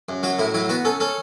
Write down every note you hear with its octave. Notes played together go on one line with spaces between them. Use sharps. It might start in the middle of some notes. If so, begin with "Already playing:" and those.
F#2
F#3 F#4
A2 E4
F#3 E4
B3 F#4
C#4 A4
C#4 A4